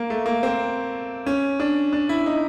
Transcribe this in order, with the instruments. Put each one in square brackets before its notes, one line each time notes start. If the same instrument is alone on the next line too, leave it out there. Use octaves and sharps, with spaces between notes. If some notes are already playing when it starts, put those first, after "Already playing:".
Already playing: [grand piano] A#3
A3
A#3
C4
C#4
D4
D4
E4
D#4